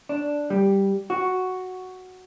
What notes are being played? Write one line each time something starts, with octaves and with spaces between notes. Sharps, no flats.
D4
G3
F#4